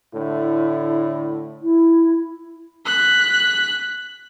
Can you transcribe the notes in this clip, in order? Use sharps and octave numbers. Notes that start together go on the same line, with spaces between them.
A2 D3 E4
E4
F#6 B6